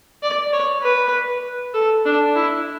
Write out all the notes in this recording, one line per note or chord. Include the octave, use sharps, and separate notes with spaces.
D5
C#5
B4
A4
D4
E4